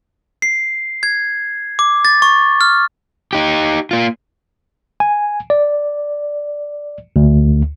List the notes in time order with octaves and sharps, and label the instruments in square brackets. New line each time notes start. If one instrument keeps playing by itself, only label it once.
[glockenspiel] C7
G#6
D6
A6
C#6
F6
[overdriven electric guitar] D#4 G4
A#3 F4
[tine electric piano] G#5
D5
D2